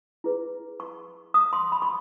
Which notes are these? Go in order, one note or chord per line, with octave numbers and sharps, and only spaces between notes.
E4 G#4 B4
C#6
D#6
C6
B5
C#6